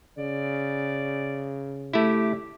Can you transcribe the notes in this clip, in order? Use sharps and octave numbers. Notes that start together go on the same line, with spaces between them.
C#3 D5
A3 E4 G4